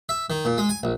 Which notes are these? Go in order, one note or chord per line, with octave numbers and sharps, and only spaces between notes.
E5
D#3
A#2
G#3
G#5
A#1